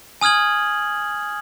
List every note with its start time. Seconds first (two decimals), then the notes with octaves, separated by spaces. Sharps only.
0.21 G#5 D#6 F6 G#6 F#7